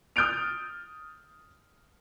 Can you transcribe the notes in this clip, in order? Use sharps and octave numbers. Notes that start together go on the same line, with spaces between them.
D#6 F6 G6 A6 D7 F7